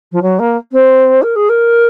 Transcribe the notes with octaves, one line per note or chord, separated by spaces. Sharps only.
F3
F#3
A#3
C4
A#4
G#4
A#4